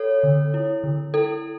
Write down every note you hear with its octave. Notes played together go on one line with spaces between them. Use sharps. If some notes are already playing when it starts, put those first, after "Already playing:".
Already playing: A4 C#5
D3
E4
D3
E4 A4